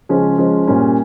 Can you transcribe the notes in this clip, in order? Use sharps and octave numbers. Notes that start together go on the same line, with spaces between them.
C#3 F3 G#3 C#4
F3 G#3 C#4
A#2 G3 A#3 C#4